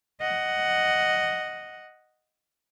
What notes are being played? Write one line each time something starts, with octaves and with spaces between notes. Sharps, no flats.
D#5 F#5